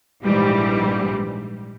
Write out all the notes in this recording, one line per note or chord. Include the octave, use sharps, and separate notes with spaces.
A#1 G#2 E3 G3